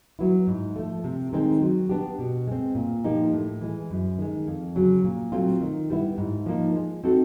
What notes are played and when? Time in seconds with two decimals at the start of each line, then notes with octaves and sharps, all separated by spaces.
0.19 F#3 B3 E4
0.47 G#2
0.76 F3 A3
1.04 C3
1.32 D#3 G#3 C4 D#4
1.62 F#3
1.89 B3 D4 G4
2.19 B2
2.47 G#3 C4
2.75 A#2
3.04 F3 A#3 D#4 G4
3.32 A2
3.61 E3 G#3
3.90 F#2
4.18 D#3 G#3
4.47 F2
4.75 C#3 F#3
5.04 A#2
5.32 F#3 A3 C4 F4
5.61 D#3
5.90 G3 B3 E4
6.18 G#2
6.46 F3 A#3 D#4
6.76 G#3
7.04 C4 D#4 F#4 A4